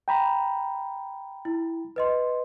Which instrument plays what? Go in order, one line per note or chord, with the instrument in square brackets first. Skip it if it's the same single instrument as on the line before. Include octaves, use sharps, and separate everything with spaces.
[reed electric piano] G5 A#5 B5
[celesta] E4
B4 D#5 C6